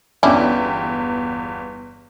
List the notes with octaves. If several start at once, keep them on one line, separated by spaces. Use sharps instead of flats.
G1 E2 C#4 D4 E4 G5